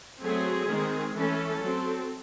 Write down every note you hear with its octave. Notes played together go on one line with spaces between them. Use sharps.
F#3 A3 C4 G#4
D#3 G#3 C4
E3 A3 C#4 A4
F#3 C4